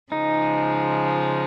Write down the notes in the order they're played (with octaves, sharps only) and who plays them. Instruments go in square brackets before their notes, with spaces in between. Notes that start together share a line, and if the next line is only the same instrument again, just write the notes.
[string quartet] C#3 F3 G#3 [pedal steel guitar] D#4